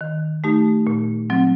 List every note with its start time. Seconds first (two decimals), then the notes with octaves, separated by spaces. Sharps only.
0.01 D#3
0.44 A3 D#4 G4
0.87 A#2
1.30 F#3 C4